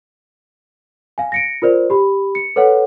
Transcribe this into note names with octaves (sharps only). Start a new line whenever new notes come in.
F5 G#5
A#6 C#7 D7
F4 A#4 C5 D5
G4 B5
C#7
A4 B4 C#5 F#5